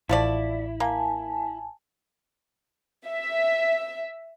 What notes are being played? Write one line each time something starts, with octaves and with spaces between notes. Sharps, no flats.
A1 F3 A3 E4 D5
A#3 G#5 A5
E5